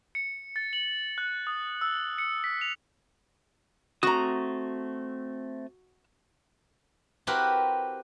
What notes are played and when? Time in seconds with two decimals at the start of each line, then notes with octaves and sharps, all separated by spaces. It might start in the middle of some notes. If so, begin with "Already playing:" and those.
0.15 C#7
0.56 A6
0.73 F#7
1.18 F#6
1.47 D#6
1.81 E6
2.18 C#7
2.44 B6
2.61 F7
4.03 A3 C4 F#4 A#5 D#6
7.27 C4 E4 F#4 G4 A#4 B4